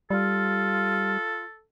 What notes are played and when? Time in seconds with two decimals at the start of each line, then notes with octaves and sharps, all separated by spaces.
0.10 G3 F4 A4